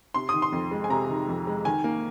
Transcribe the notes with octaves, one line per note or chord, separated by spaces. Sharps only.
C3 C6
D#6
D#3
C6
F2
G#3
G#5
C3 A#5
D#3
F2
G#3
D#3 G#5
A#3